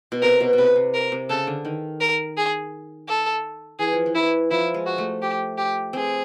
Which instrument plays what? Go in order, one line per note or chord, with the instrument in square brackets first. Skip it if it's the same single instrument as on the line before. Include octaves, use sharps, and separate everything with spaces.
[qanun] B2
[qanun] C3 [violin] A#4
[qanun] B2
B2
[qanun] C3 [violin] B4
[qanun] C3
[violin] A#4
[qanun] C3
[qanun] C#3 [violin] A4
[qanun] D3
D#3
[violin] A#4
G#4
A4
[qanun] E3 [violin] G#4
[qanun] F3
E3
[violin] E4
[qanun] F3 [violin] E4
[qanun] G#3
[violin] F#4
[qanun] A3
[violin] G4
G4
[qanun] C4 [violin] G#4